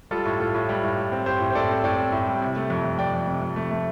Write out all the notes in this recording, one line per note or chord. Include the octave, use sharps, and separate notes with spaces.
G3 F4 A4
A2
A2 F4 A4
A2
G3
A2
A2
C4
A2 G4 C5
A2
C5
A2 A4 D5
C4
A2 D5 G5
C4
A2
G3
C3
A3
F2
F2
F2 D5 G5
F2
C3
F2
A3
A3